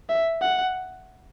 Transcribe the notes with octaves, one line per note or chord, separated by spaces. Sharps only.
E5
F#5